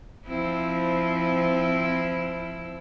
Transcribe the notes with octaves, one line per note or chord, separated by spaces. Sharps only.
F3 C4 E4